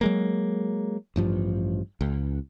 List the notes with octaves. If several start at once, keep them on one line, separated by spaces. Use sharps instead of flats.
F#3 G#3 A#3
A1 G2 F3
C#2